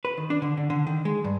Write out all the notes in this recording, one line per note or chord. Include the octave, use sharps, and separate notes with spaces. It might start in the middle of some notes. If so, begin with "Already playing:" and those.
B4
D#3
D4
D3
D3
D3
D#3
G#3
G2